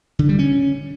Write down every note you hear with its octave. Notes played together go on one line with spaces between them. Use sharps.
D3
G3
C#4